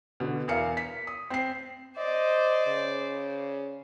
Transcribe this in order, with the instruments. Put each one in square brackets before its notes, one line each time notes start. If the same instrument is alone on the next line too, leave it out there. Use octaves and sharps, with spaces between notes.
[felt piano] B2 D3
E2 A#4 F5 C#7
B6
D#6
C4 C7
[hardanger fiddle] C5 D5 [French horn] D#5
[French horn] C#3